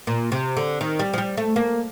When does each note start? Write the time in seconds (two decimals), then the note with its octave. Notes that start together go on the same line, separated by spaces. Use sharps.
0.07 A#2
0.32 C3
0.57 D3
0.81 D#3
0.99 G3
1.13 F3
1.18 G3
1.37 A3
1.56 A#3